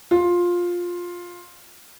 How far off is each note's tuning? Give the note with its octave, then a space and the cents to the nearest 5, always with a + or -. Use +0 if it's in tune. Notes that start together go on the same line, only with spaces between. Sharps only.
F4 +10